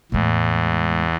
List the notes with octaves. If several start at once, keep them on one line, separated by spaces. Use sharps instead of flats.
E2 A2 G#3